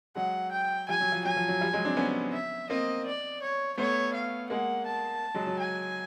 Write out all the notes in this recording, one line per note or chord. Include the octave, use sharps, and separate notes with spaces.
F#3 G#3 F#5
G5
F3 G3 G#5
F#3
F3
F#3 G#5
F3
F#3
F3 G3
F#3 G#3
C4 D4
B3 C#4
E5
A#3 C4 D#5
D5
C#5
A3 B3 C#5
F5
G#3 A#3 F#5
A5
F#3 G#3
F#3
G#5